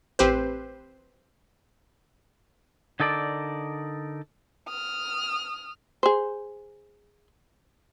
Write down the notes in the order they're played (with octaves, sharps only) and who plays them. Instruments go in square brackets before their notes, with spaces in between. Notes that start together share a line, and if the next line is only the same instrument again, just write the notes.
[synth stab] A1 C4 G4 B4 C5
[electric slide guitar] D3 D#4 A4 A#4 D5
[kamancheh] D#6 F6
[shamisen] G#4 C5